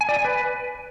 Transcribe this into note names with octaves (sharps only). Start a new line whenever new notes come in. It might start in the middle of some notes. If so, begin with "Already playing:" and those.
G#5
D5
G#5
B4